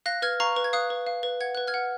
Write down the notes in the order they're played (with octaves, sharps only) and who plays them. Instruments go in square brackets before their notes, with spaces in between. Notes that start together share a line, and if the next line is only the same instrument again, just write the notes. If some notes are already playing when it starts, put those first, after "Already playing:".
[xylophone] F5 F#6 A#6
B4 F6 G#6
F5 A#5 C#6
B4
G#6
F5 D#6 F#6
B4
F5
B4
F#5 G#6
B4 F#6
F6 G#6
F#5